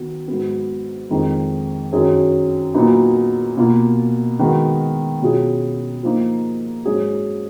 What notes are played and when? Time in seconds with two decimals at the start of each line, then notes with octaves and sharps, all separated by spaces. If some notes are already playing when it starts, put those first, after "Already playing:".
Already playing: D#3 F#3 B3
0.28 G#2 F#3 B3
1.10 F2 D#3 G#3 D#4
1.92 F#2 D#3 F#3 C#4 G#4
2.74 A#2 F#3 B3 D#4
3.57 B2 A#3 F4
4.39 D#3 G#3 B3 F#4
5.21 B2 F#3 C#4 F4 G#4
6.03 F3 A#3 D#4
6.85 G#2 F#3 C#4 G#4